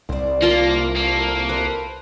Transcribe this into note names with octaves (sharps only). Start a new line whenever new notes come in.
C2 C5 D5
A#3 F4 A5 C6
A3 A#3
A3 B4 C5